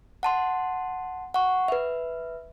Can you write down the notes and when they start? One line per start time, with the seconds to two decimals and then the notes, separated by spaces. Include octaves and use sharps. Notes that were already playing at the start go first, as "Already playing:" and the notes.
0.23 F#5 A5 C6
1.34 F#5 C#6
1.68 B4 E5